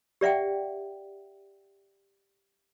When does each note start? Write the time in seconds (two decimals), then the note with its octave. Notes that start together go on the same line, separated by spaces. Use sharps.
0.21 G4 D5 E5 F#5 G5